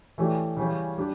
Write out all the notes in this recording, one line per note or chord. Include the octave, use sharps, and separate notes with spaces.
E3 A3 C#4 G4 D5
C#3 E3 G3 C#4
G3 D4